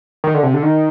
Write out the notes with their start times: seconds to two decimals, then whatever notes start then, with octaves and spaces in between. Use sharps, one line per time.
0.24 D#3
0.34 D3
0.43 C3
0.54 D3
0.63 D#3